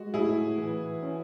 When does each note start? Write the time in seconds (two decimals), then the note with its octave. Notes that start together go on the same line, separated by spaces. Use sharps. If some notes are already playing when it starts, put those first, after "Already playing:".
Already playing: G#3 F#4
0.14 A2 E4 G#4
0.58 E3
1.03 C#4